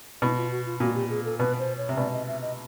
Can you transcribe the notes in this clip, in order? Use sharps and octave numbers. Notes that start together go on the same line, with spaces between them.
B2 E4
F4
F#4
F4
A#2 F#4
G4
G#4
A4
B2 B4
C5
C#5
C3
B2 D5
D#5
E5
D#5